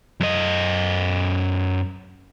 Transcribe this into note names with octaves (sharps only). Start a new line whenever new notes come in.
F#2 D#5